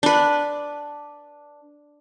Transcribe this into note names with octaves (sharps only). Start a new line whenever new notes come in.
D4 B4